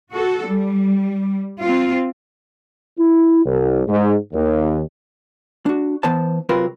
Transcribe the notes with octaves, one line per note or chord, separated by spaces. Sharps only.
F#4 A4
G3
C4 F4
E4
C2
G#2
D#2
D4 F#4
E3 B3 C5 A5
C3 F#3 C4 F4 A#4 B4